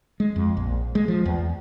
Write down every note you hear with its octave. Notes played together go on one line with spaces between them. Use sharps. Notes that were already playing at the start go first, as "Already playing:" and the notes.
G#3
F2
A#1
G#3
F3
E2